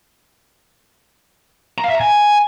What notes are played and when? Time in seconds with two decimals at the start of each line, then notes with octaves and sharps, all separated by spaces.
1.78 A#5
1.84 F5
1.89 E5
1.95 A#5
2.00 G#5